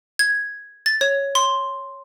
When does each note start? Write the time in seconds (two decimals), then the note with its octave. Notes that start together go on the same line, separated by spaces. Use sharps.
0.19 G#6
0.86 A6
1.01 C#5
1.35 C6